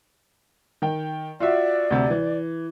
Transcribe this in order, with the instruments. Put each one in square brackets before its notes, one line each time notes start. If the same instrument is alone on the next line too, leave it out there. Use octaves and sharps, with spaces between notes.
[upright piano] D#3 G5
[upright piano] F4 F#4 E5 [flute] D5
[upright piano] D2 C3
E3